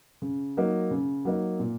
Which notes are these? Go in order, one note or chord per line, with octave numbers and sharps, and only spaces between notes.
C#3
F#3 A#3 D#4
C#3
F#3 A#3 D#4
A#2